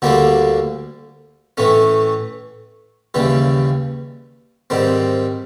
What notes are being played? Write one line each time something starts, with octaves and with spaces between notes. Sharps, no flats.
D2 D3 G3 A#3 D4
A2 E3 A3 C#4
D#2 C#3 E3 G3
G#2 D#3 G3 C4